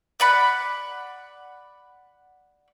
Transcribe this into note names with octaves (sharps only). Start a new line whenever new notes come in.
D5 F#5 B5